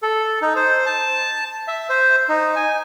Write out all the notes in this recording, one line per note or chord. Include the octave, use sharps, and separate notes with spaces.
A4
D#4
C5
A5
E5
C5
D#4
G#5